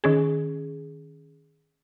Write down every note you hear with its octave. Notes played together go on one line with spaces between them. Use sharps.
D#3 C#4 G#4